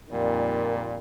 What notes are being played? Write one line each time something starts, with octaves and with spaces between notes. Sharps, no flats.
F2 A#2 D#3 G3